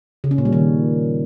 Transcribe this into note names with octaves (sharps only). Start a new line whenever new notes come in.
C#3
C#4
A#2
G3
D#3